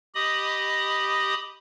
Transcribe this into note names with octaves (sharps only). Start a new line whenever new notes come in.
G4 D#5 B5 D#6